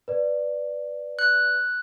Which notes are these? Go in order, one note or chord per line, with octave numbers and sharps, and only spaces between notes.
B4 D5
F#6